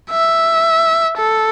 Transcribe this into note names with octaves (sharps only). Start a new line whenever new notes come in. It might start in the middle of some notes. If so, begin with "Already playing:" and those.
E5
A4